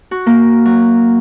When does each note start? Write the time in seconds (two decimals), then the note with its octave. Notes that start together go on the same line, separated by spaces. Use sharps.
0.11 F#4
0.26 A#3
0.65 F#3